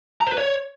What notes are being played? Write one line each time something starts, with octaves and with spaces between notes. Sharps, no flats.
A#5
C5
B4
C#5